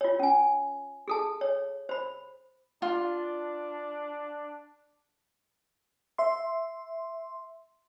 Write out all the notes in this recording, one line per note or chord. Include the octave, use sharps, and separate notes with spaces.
F4 C#5
C#4 G#5
G#4 A4 A5
C#5
C5 B5
D4 F4
E5 C6